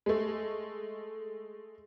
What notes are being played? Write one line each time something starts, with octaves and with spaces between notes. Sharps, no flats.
G#3 A3